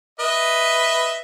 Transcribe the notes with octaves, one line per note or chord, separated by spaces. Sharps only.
B4 D#5 E5